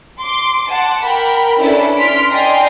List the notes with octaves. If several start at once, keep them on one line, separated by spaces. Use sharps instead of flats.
C6 D6
F#5 A5
A#4 G5 B5
C#4 D4 E4 A4 B4
D4 C6 F6 B6 D7
D5 D#5 G5 G#5 A#5 C6